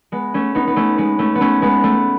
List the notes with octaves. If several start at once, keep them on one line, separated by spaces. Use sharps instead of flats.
G#3 B3
A3 C#4
B3 D#4
B3
A3 C#4
G#3 B3
A3 C#4
B3
A3 C#4
G#3 B3
A3